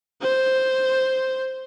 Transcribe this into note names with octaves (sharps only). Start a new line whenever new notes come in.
C5